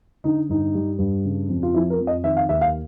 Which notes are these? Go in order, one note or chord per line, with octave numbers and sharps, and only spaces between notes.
D3 D#4
G2 D#4
G3
G2
C#3
F2
F4
F3 E4
A#4
F2
D#5
D#3 E5
F5
D#2 E5
F5